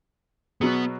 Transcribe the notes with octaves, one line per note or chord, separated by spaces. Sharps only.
B2 F#3 B3 G#4